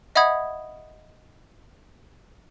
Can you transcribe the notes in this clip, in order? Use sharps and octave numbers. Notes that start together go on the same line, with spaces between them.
D#5 E5 F#5 B5 D#6 G#6